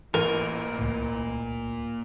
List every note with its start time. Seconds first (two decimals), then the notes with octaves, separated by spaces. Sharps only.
0.14 A1 A#2 A#4 G#5
0.79 C#2 A2